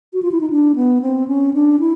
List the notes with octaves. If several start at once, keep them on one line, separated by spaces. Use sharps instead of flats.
F#4
F4
E4
D#4
D4
B3
C4
C#4
D4
E4